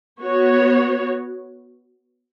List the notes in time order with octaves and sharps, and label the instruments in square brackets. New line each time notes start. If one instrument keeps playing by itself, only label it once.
[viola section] B3 F#4 C#5